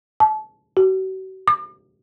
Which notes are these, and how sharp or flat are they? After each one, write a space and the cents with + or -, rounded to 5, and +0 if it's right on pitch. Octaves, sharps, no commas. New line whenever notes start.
A5 -30
F#4 +40
D6 +45